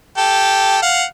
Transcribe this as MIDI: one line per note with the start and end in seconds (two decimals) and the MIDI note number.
0.17 0.82 67
0.17 0.82 69
0.82 1.04 77
0.82 1.04 78